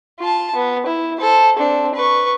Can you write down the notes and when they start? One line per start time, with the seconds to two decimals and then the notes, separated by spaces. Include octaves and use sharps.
0.19 F4 A5
0.55 B3
0.86 E4
1.19 A4 C5
1.57 C4 D4
1.95 B4 C#6